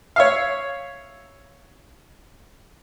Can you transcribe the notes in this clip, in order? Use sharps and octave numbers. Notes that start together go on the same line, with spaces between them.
C#5 E5 F5